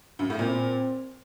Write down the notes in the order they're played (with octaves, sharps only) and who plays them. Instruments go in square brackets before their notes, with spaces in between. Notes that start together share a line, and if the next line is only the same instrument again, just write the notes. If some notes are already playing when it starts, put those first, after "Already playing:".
[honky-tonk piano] F#2
A2
[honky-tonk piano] A#2 [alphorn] C4